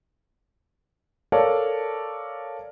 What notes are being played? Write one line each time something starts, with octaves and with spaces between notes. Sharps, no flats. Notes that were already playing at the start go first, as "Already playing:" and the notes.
A4 A#4 C#5 D5 F5 A5